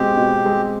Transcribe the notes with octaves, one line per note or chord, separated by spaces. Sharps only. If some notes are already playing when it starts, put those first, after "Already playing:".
Already playing: B2 G#3 C4 G4
B2
G#3 C4